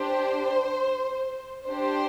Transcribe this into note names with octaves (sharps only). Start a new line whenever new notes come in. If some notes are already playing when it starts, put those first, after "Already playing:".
Already playing: D4 G4 C5
D4 G4 C5